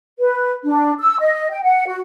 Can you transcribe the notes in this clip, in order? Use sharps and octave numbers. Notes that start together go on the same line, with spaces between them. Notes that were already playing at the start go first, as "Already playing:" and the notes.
B4
D4
E6
D#5
G5
F#5
F#4